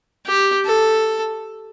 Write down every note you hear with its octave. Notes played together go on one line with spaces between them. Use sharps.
G4
A4